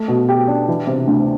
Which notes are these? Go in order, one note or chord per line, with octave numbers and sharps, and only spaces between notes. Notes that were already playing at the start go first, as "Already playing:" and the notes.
Already playing: A3
B2
G4
D4
E3
C3
D2